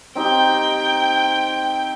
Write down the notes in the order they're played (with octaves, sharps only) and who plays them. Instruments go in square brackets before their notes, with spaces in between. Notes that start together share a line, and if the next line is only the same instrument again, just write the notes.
[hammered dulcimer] C4 D#4 G4 [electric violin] G5 G6